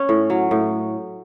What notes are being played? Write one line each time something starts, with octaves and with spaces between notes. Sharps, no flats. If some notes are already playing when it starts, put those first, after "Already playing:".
Already playing: C#4
A2
F#3
A2